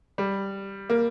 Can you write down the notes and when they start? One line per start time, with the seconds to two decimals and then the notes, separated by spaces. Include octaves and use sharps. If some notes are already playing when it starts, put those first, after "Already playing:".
0.18 G3
0.90 A#3